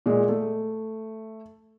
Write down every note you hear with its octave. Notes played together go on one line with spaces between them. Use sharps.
A#2 G#3
A3